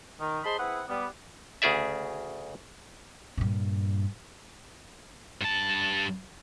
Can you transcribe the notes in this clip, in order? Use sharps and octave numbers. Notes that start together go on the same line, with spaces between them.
D#3
G#4 C5 D#5 A5 B5 C6
C4 E4 G#4 B4 F#5
G3 B3
D2 C#3 G#4 D5 E5
G2 A#2
G2 A5